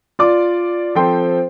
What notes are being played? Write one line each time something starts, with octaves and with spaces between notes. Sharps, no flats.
F4 D5 D6
F3 C4 A4 G5 C6